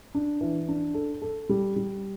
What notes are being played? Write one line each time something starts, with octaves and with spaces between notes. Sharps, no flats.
D4
E3
D4
A4
A4
G3
G3